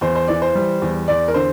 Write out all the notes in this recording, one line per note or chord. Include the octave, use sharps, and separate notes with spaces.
E2 C5
C5
E3 D5
C5
G3
E2
E2 D5
A#4
D3 C5